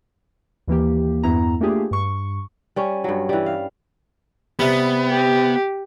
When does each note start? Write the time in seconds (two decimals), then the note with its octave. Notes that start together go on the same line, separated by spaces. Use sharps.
0.67 D#2 E3 A#3 G4
1.23 E2 G2 B3 E4 A#5
1.61 A3 A#3 D4 F4 G4 G#4
1.91 G2 C#6
2.76 G3 C#4 C#5
3.04 G2 F#3
3.29 E3 G3
3.46 F5
4.59 C3 G3 B3
5.08 G4